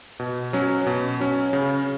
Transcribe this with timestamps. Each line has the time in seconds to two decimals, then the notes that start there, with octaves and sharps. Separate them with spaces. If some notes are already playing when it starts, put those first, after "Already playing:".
0.20 B2
0.53 F#3 C#4
0.87 B2
1.20 F#3 C#4
1.53 C#3